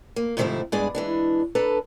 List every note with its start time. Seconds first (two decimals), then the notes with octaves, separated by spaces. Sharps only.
0.16 A#3
0.37 G#2 C3 D#3 F3 A3 E4
0.72 G2 G#3 B3 D4 G#4 D5
0.95 E3 G#3 D4
1.55 D4 A4 B4 A#5